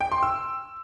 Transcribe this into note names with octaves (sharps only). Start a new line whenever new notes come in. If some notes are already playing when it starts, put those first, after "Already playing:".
G5
C6
E6